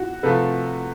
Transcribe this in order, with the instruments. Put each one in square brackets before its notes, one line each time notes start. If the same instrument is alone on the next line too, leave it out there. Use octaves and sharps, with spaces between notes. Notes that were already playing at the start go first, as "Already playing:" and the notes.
Already playing: [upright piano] F#4
[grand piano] C3 F3 A3 [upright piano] A4 B4